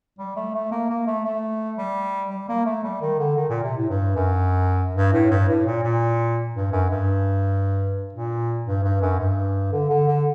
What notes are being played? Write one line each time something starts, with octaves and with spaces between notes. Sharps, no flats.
G3
A3
A3
A#3
A#3
A3
A3
G3
G3
A#3
A3
G3
D#3
D3
D#3
A#2
C3
A2
G2
F#2
G2
A2
G2
A2
A#2
A#2
G2
F#2
G2
A#2
G2
G2
F#2
G2
D3
D3
D3